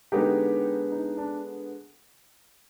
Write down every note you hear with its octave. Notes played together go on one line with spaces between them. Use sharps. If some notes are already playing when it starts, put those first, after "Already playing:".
D3 G#3 B3 D#4 G4
D#4
D4